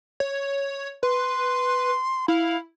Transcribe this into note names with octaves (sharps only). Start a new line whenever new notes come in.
C#5
B4 C6
E4 F5